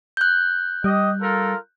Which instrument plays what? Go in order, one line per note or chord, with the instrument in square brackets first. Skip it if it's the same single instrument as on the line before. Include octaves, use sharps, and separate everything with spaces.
[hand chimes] F#6 G6
[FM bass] G3 [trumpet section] G4 D#5
[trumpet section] F4 A4 A#4